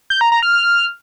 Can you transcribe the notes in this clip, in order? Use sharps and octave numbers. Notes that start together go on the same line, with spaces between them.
G6
A#5
A#5
F6
F6